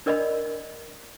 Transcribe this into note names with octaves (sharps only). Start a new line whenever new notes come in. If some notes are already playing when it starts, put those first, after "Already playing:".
D4 A#4 D5 D#5 B5